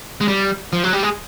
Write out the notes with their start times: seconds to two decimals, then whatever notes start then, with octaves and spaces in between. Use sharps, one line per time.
0.21 G#3
0.28 G3
0.73 F3
0.84 F#3
0.93 G3
1.03 G#3